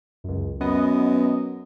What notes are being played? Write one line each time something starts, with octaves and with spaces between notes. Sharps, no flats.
C#2 F#2
F#2 B3 D#5